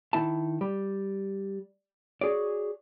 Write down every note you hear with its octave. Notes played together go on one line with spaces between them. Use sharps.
D#3 E4 E5 A5
G3
F#4 G#4 C#5 D5